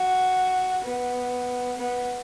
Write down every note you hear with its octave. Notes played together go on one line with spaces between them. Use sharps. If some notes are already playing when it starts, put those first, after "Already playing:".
Already playing: F#4
B3
B3